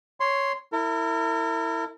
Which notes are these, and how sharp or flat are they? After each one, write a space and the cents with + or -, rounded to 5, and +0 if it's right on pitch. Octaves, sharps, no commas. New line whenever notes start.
C#5 +0 C6 +0
E4 +0 A#4 -40